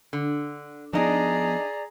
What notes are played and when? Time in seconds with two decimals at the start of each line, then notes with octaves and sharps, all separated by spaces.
0.13 D3
0.93 F3 B3 D4 D#4 G#4 D5 D#5 A#5